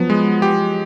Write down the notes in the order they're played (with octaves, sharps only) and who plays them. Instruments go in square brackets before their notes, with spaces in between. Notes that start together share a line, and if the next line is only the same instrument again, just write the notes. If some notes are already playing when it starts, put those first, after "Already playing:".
Already playing: [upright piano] F3 F#3 [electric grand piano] B3
[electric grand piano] G#3
G4